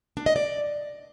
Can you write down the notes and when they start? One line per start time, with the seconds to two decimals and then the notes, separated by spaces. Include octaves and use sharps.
0.17 D4
0.26 D#5
0.36 D5